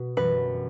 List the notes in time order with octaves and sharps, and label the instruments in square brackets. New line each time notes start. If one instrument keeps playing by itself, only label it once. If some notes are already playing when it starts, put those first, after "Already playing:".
Already playing: [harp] B2 B3
[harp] G1 F#2 E3 [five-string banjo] B4